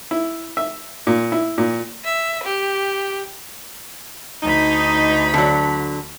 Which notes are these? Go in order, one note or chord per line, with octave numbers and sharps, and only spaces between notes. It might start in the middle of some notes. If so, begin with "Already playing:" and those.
E4
E5
A#2
E4
A#2
E5
G4
D2 D#4 B5
D3 F#3